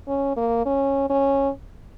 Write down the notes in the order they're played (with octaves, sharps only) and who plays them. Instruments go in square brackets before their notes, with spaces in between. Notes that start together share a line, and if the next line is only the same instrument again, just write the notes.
[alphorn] C#4
A#3
C#4
C#4